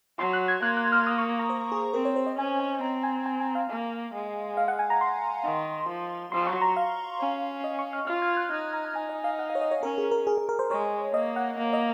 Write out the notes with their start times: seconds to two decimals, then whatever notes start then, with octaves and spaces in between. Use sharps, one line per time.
0.18 F#3 C6
0.33 F#6
0.48 G#6
0.62 A#3 F#6
0.77 F#6
0.92 F6
1.07 D#6
1.18 C#6
1.39 A#5
1.50 C5
1.72 G#4
1.94 C4 A#4
2.05 C#5
2.16 C5
2.27 D#5
2.38 C#4 G#5
2.60 G#5
2.81 C4 A#5
3.03 G#5
3.26 G#5
3.40 G#5
3.55 F5
3.69 A#3
4.14 G#3
4.57 F5
4.68 F#5
4.79 G#5
4.90 A#5
5.01 C6
5.44 D#3
5.88 F3
6.32 F#3 C6
6.47 C#6
6.61 A#5
6.76 F5
7.20 C#4
7.64 D#5
7.79 C#6
7.93 F6
8.07 F4 F6
8.22 G#6
8.37 F#6
8.51 D#4 F#6
8.73 A#5
8.85 A#5
8.95 D#4 G#5
9.09 D#5
9.24 F5
9.39 F#5
9.50 F5
9.55 C#5
9.61 D#5
9.71 C#5
9.82 C#4 A#4
9.98 G#4
10.11 A#4
10.27 G#4
10.38 G#4
10.49 A#4
10.59 C5
10.70 G#3 C#5
11.14 A#3 D#5
11.36 F#5
11.58 A#3
11.73 D#5